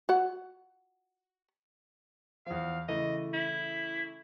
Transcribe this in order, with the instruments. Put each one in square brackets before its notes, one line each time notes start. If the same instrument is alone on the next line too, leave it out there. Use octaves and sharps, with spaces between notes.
[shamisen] F#4 F#5
[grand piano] E2 F3 [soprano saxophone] F5
[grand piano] C#3 E3 A3 [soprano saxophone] D#5
[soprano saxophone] E4